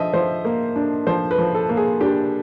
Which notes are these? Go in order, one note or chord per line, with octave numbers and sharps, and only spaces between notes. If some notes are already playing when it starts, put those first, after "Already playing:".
Already playing: F3 D4 D#5 E5
F3 C5
A#3
D4
F3 C5
B4
F3
A4
A#3
G#4
D4 G4